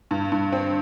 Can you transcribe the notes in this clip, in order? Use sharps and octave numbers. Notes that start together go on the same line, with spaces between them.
G2
G2
C4